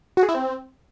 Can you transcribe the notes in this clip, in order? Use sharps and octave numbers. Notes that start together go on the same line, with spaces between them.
F#4
G#4
E4
C4